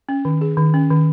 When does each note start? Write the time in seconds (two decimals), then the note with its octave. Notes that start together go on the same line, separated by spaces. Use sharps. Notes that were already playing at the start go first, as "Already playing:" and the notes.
0.09 C#4
0.25 D#3
0.41 G#4
0.57 D#3
0.74 C#4
0.90 D#3